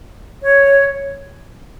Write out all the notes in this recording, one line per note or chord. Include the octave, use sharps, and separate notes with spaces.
C#5